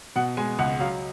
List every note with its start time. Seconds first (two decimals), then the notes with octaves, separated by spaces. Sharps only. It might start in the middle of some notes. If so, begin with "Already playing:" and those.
0.16 B2 F#5
0.37 G#3 G#5
0.59 C#2 F#5
0.80 F#3 F5